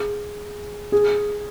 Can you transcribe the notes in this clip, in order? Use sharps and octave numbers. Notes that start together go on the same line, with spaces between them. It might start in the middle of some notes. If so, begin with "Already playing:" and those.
Already playing: G#4
G#4